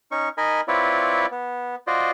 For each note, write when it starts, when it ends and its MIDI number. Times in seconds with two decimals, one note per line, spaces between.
0.11 0.29 61
0.11 0.29 63
0.11 0.29 85
0.38 0.61 63
0.38 0.61 70
0.38 0.61 75
0.38 0.61 80
0.38 0.61 83
0.68 1.26 60
0.68 1.26 64
0.68 1.26 65
0.68 1.26 71
0.68 1.26 73
0.68 1.26 74
1.31 1.75 59
1.87 2.11 65
1.87 2.11 66
1.87 2.11 72
1.87 2.11 74
1.87 2.11 75